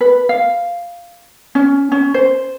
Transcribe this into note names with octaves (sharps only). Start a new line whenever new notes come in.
B4
F5
C#4
C#4
C5